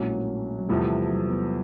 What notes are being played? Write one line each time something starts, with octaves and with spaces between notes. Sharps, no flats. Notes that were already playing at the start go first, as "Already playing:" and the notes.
Already playing: A#1 A2 F#3 G#3 A#3 C#4
F#3
E2 C3 F3 G3 A3
F#3
B3